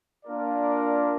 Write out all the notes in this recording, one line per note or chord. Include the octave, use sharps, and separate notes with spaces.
A#3 D4 F4 A#4 D5